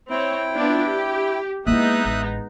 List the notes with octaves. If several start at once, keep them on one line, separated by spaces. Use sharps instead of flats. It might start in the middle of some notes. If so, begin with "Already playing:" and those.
C4 E4 C#5 G5
B3 D4 F4
G4
G#3 A#3 B3 D#4 E4 E5 D#6 F#6
A1